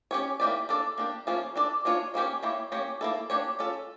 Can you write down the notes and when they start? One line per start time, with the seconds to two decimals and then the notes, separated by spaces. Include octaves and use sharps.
0.11 C#4 G4 C#5
0.40 E3 A#3 D4 G4 D5
0.69 A#3 D4 A4 D5
0.98 A#3 D4 G4
1.27 F3 A#3 C#4 F4
1.56 D4 A4 D5
1.85 A#3 D4 F4 C#5
2.14 F3 A#3 C#4 G4
2.43 A#3 E4 G4 C#5
2.72 A#3 C#4 G4 C#5
3.01 A#3 E4 A4
3.30 A#3 D4 G4 C#5
3.59 C#4 F4 A4